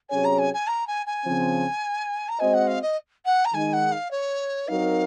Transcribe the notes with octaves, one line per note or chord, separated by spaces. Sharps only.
C3 F#3 C#4 G#4 C#5 G#5
A#5
G#5
G#5
A#5
G#5
G#5
C#3 F3 C4
A#5
G#3 C4 F#4 C5 D#5 G#5
F#5
F5
D#5
F#5
A#5
D#3 G#3 D#4 G#5
F#5
F5
C#5
F#3 C4 D#4 A#4 F5